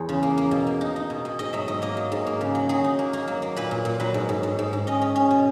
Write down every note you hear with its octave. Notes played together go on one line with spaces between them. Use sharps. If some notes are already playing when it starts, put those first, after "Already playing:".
Already playing: E2 C#5
C#3
A#3
A#3
B2
A#3
D#4
D#4
B2
B2
G#2 D#5
F#3 E5
G#2 D#5
A#3 D#5
F#3
G#2
A#3
C#3
F#3
F#3 G#4
D#4
A#3
A#3
F#3
A#3
A#2 B4
A#2
A#2
F#3 B4
G#2
G#2
G#2
G#2
G#2
C#4 D#5
C#4
C#4
B2